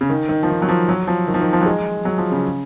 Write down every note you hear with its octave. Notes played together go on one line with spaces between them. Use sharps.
C#3
D#3
D#3
F3
D#3
F#3
F3
F#3
F3
D#3
F3
D#3
F3
F#3
G#3
F#3
F3
C#3